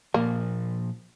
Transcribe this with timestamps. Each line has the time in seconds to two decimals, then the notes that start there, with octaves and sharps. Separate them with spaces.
0.14 A#2 F3 A#3